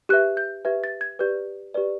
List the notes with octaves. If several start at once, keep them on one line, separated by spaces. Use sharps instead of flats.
G4 B4 E5 F#6
G6
G4 B4 E5 G#6
A6
G#6
G4 B4 D5 G6
G4 B4 D5